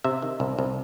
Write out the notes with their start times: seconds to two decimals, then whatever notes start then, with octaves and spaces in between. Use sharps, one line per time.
0.04 C3 E5
0.22 D#3
0.40 C2
0.59 C2